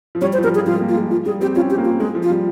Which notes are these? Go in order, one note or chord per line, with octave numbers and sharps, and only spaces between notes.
F3
G3 C#5
C5
F3
G3 A#4
G#4
F3
G3 F4
G#3
A#3
F4
G#3
F3 F4
G3 G#4
C4 G4
C#4 F4
G4
A#3
F4
G#3 G#4
F3
F4
G3